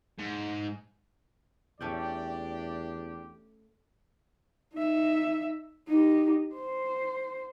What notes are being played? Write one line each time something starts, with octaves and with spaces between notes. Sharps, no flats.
G#2
E2 A3 C#4 D4 G4 D5 G5
D#4 E5
D#4 G4
C5